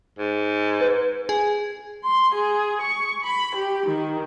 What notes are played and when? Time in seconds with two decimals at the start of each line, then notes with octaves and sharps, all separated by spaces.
0.19 G#2
0.81 B4
1.29 G#4
2.04 C6
2.34 G#4
2.81 C#6
3.24 B5
3.55 G4
3.86 D#3